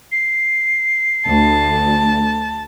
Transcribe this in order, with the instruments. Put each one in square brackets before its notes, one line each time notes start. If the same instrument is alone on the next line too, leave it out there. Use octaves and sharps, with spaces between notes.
[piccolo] C7
[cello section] D2 [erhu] A5